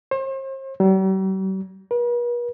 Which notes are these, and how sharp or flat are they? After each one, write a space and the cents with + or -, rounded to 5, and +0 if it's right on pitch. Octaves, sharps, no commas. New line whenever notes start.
C5 +40
G3 -45
B4 -45